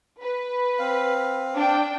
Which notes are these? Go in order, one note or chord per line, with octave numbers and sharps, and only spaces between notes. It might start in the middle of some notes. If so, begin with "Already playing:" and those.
B4
C4 F5
D4 G5